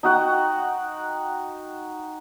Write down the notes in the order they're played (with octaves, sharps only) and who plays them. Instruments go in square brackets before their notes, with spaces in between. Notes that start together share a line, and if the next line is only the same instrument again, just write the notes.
[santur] D#4 F#4 F#5 G5